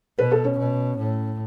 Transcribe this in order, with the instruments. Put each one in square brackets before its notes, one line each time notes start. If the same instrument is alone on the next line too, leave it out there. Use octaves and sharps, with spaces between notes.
[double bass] B2 [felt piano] B4
[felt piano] A4
C#4
[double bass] B2
A2